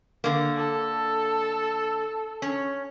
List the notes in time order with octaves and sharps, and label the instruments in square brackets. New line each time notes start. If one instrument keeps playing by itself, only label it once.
[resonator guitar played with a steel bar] D3 A#3
[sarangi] A4
[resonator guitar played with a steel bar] C#4